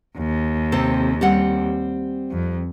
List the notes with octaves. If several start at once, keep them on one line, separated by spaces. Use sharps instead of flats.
D#2
C3 C4 A4
G3 C4 F#5
F2